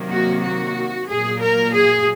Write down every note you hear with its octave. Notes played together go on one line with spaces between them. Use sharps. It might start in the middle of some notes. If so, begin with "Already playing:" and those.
Already playing: C3 D#3 F#3 A#3
F#4
F#4
A#2 F#3 A#3 G#4
A#4
G#4